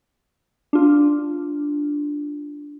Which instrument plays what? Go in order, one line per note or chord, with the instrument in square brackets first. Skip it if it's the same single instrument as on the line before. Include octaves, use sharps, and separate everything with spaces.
[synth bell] D4 F4